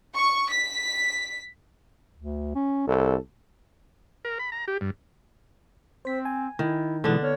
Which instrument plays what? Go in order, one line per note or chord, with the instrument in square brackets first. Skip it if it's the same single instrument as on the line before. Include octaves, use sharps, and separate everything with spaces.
[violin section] C#6
B6
[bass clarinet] D2
C#4
[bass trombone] C2 [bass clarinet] A4
[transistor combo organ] A#4
B5
A#5
G4
G2
[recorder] C4 [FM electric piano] C5 B6
[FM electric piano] G#5
[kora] D#3 [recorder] E4
[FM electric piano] B2 E3 G#3 [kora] D3 D4 [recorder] B3
[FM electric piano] B3 F6 [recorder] C#5